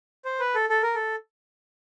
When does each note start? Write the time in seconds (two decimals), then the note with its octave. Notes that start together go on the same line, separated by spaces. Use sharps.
0.25 C5
0.40 B4
0.55 A4
0.70 A4
0.83 A#4
0.95 A4